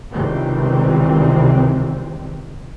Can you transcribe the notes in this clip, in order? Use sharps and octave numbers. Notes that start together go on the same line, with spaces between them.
C#2 C3 D#3 E3 G3 C4